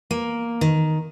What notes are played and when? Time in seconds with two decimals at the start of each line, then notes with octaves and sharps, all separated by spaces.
0.11 A#3
0.61 D#3